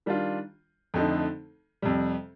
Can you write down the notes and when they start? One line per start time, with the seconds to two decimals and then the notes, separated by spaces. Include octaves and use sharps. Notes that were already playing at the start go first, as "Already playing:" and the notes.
0.06 D#3 G3 D4 F4
0.94 F2 D3 A3 D#4
1.82 F2 C3 G3